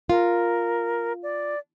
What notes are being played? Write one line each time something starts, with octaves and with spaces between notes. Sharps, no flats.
F4 A#4
D5